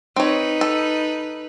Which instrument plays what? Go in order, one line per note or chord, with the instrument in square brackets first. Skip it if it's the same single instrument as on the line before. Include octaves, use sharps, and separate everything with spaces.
[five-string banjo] C4 C#5 [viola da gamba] D#4 B4
[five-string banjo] A4